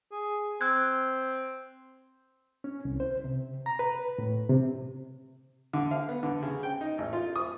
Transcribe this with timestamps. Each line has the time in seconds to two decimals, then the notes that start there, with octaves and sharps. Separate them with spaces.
0.12 G#4
0.61 C4 E6 F#6 G#6
2.64 C#4
2.85 C2
3.00 C5
3.24 C3
3.66 A#5
3.79 B4
4.18 A2
4.49 C3
5.73 D3
5.91 F5
6.09 B3
6.23 D3
6.43 C#3
6.63 G5
6.81 D#4
6.98 A1
7.13 F4
7.36 D#6